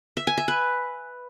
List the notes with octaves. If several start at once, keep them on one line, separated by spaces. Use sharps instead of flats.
E5
G#5
E5
B4